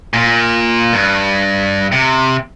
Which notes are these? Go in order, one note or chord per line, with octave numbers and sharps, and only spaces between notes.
A#2
G2
C3